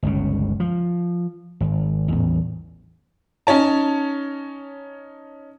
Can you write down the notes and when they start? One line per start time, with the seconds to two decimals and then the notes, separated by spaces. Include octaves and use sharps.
0.03 G1 C#2 C#3
0.60 F3
1.60 G#1
2.08 A1 E2
3.47 C#4 D#4 C#5 A5